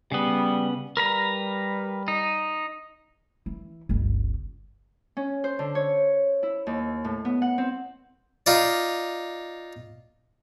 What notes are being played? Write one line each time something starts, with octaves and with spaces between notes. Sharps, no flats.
C#3 G3 B3
G3 A#4 B4 A#5
D#4
E3
G1 C#2
C#4
C5
D3
C#5
E4
D#2
A2
B3
F#5
C4
D#4 F4 D5